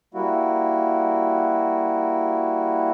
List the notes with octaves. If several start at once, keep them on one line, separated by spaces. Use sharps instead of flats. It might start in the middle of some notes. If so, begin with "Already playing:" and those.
G3 A#3 E4 F#4